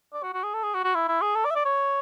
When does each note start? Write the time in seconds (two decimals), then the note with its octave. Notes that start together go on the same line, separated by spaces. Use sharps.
0.13 D5
0.23 F#4
0.33 F#4
0.44 G#4
0.54 A4
0.63 G#4
0.74 F#4
0.84 F#4
0.95 E4
1.08 E4
1.22 G#4
1.35 A4
1.45 D5
1.50 E5
1.55 D5
1.65 C#5